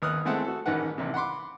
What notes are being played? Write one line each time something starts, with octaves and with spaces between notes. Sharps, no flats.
G#1 D#2 B4 D#6 F6 F#6
E3 G#3 A3 C4 F#5 A5
F#4 A4
A1 G#2 D#3 B4 F#5
A1 C3
F#5 B5 C6 D6